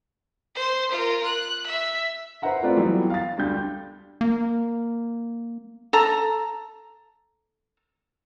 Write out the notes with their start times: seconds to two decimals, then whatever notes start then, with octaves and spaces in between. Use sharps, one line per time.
0.55 C5 C6
0.91 F4 A#4
1.25 F#6
1.67 E5
2.42 B4 C5 E5 F#5 A#5
2.63 A3 C4 F4 B4 D5
2.77 E3 F#3 G3 B3
3.10 F5 A6
3.38 D2 G3 G6
4.21 A#3
5.93 A4 A#5